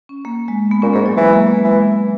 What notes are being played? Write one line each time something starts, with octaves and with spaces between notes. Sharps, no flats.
C#4
A#3
G#3
B3
A#2 C#4
G#2 A#3
F#3
E3 G#3
A#3
B3
E3 G#3
F#3